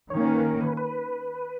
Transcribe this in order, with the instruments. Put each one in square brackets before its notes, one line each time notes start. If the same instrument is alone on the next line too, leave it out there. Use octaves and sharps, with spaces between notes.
[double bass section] D#3 A#3 C#4 [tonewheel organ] C#5
[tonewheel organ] B4
A#4
B4
B4